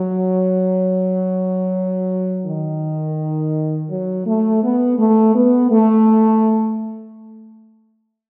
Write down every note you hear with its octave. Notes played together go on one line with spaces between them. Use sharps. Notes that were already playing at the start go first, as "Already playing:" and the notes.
Already playing: F#3
D#3
F#3
A3
B3
A3
B3
A3